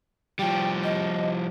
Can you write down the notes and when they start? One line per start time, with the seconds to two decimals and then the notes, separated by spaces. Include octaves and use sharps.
0.39 F3 G3 G5
0.84 D#5